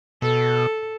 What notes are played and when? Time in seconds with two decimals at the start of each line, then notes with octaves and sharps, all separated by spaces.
0.22 B2 A4